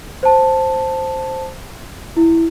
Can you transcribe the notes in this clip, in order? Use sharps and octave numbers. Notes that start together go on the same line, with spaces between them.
C5 A5
E4